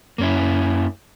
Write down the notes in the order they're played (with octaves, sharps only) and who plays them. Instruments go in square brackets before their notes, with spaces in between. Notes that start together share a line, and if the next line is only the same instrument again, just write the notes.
[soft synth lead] F#2 [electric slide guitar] A#3 C#4 E4